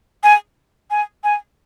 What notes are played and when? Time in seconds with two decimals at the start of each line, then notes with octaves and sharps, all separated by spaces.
0.23 G#5
0.91 G#5
1.24 G#5